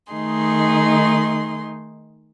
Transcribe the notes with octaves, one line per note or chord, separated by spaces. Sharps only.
D#3 A3 D#4 G#4 C6